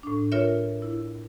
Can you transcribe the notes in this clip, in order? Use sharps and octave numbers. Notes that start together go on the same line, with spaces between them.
A2 D4
F4 A#4 C#5 E5
E4